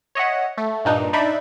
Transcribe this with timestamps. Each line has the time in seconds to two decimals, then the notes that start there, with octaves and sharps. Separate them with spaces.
0.15 C#5 D#5 E5 F#5
0.58 A3
0.85 G2 A#2 D4 D#4
1.13 D4 D#4 D5 E5 B5